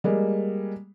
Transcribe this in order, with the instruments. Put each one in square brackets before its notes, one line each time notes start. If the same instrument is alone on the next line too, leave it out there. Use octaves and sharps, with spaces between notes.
[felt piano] G3 G#3 A#3